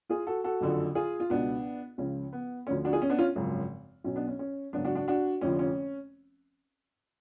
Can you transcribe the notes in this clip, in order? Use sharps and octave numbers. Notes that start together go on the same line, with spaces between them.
F4 G#4
F#4 A4
F#4 A4
F#1 F2 D3 F3
F4 G#4
F4
C#2 B2 B3 D4
C#2 C#3 F3 C#4
B3
D2 D3 F3 C#4
D4 F#4
F4 G#4
C#4
B3 D4
C#4 F4
G#1 F#2 C#3 F3
B1 B2 C#4
B3 D4
C#4
C#4
G#1 F#2 C#3 B3 D4
D4 F#4
D4 F#4
D4 F#4
F1 F2 D3 F3 C#4
C#4